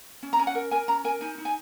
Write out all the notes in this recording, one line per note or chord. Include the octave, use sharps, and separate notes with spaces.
C#4
A#5
C#4 G#5
F#5
A#4
A#4 G#5
C#4 A#5
A#4 G#5
D#4 G#5
D#4
G#5